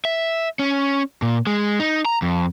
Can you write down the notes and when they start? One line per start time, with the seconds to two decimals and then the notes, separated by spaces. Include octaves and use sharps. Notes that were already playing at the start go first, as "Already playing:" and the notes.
0.05 E5
0.59 C#4
1.22 A#2
1.47 G#3
1.80 D#4
2.05 A#5
2.22 F2